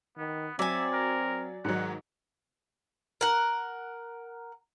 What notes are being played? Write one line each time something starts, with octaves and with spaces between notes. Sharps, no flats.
D#3 B3
F#3 C4 D5 E5 G#5
A#4
G#2 D#3 F#3 F#5
A#4 F#5